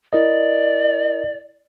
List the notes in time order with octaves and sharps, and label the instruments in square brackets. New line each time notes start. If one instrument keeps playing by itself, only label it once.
[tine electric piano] E4 A#4 D#5 [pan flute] D5